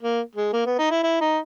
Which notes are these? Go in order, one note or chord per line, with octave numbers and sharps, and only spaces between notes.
A#3
G#3
A#3
B3
D#4
E4
E4
D#4